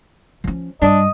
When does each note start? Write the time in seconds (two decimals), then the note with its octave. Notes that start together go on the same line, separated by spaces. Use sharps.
0.44 F3 C#4
0.82 G2 D4 D#5